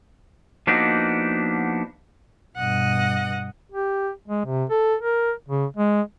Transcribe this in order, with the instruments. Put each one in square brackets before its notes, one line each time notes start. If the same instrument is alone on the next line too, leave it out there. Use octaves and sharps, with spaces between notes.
[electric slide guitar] F3 A#3 B3 D4 D#4 F#4
[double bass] G2 B2 [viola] D#5 F#5
[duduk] G4
G#3
C3
A4
A#4
C#3
G#3